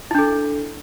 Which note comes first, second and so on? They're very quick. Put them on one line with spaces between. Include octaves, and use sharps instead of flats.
E4 D4 A4